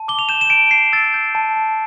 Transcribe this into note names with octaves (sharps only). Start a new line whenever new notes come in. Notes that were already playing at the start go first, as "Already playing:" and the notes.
Already playing: A5
D6 G7
F7
G6 E7
E7
A5 D7
A5 C7
E6 A6
G6
A5
A5